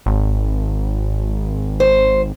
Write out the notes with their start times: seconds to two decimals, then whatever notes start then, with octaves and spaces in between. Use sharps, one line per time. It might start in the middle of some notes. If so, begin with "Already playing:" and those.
0.06 G#1
1.80 C5